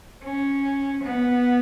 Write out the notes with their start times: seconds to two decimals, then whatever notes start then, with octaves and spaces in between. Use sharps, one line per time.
0.24 C#4
1.03 B3